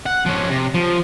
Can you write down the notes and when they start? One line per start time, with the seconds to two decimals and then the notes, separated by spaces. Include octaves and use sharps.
0.06 F#5
0.26 F3 C#4
0.51 C3
0.75 F3